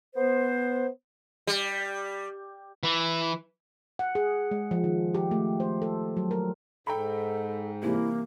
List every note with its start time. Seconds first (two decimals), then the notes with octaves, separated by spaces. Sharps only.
0.16 B3 C5
1.47 G3
2.83 E3
3.99 F#5
4.15 G#4
4.51 G#3
4.71 F3
4.84 D#3
5.14 G4
5.31 A3
5.60 C5
5.82 A4
6.17 F#3
6.31 A#4
6.87 G#2 A4 G5 A#5 B5
7.83 C3 E3 G3 A#3 E4